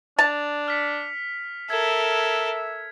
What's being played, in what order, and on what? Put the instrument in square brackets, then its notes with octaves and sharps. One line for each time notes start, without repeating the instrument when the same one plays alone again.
[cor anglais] D4 [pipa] A5 [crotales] F7
[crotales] F6 B6 C#7
[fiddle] A4 A#4 [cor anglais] E5 [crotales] G#6